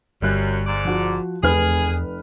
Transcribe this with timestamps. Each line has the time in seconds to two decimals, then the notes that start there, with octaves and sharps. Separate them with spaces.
0.22 G1 F#2 G3 F#6
0.67 G#2 D5
0.85 F3 F#4
1.43 F1 E2 A3 C4 G#4 B4 F6